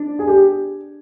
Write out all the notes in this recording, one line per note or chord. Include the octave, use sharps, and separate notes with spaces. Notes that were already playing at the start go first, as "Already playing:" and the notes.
Already playing: D4
G#4
G4